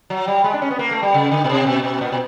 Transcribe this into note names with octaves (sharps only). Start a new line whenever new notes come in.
F#3
G3
G#3
D4
C#4
B3
A#3
A3
G3
C#3
D3
B2
C3
B2
B2
A#2
B2